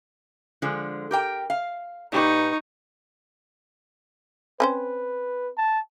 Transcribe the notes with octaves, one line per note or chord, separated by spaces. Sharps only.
D3 F3 G#3
G4 A#4 G5
F5
A#2 D#4 G4 B4 C#6
C4 C#4 B4 C5
A5